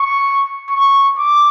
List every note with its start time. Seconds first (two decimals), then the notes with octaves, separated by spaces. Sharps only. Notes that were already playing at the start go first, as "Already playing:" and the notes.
Already playing: C#6
0.70 C#6
1.19 D6